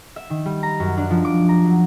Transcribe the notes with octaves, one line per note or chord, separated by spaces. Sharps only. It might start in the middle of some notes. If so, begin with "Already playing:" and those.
E5
D#3
G3
A#5
F#2
D4
F3
D6
A#5
F#3